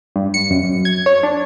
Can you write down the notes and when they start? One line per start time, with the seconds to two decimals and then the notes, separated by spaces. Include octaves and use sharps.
0.16 G2
0.34 C#7
0.51 F#2
0.63 F#2
0.85 G#6
1.06 C#5
1.23 D4